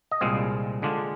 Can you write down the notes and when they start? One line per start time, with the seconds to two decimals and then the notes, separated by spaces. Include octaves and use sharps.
0.11 D#5
0.21 C2 A#2 G#3 C4 F5
0.82 D3 G#3 D4 F4